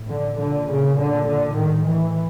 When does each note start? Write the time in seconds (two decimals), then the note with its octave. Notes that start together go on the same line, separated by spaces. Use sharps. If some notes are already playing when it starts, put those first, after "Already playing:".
Already playing: A2
0.09 D3
0.38 A#2 D3
0.68 C#3
0.97 D3
1.28 D3
1.57 A2 D#3
1.87 E3